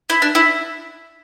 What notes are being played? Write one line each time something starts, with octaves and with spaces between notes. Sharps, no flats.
E4
D4
E4